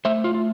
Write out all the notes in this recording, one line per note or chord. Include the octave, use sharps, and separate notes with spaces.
A3 C5 E5
F4
F4